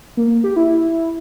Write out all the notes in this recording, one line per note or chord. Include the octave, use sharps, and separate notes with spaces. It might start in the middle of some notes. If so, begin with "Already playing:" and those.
A#3
G4
E4